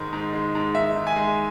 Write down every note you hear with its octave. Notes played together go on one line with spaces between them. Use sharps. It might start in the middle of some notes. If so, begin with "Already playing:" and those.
Already playing: G#2 D#3 G#3
G#2
G#3
G#2
D#3 E5
G#2
G#5
G#3